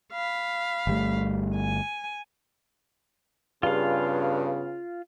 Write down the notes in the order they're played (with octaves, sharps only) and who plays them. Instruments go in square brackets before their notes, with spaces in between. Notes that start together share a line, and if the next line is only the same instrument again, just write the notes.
[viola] F5 B5
[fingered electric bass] G1 G3 A3
[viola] G#5
[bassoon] G2 [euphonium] C#3 [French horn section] G3 B3 G#4 [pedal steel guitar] F4 F5